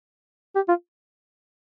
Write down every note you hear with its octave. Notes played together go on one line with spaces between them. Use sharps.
G4
F4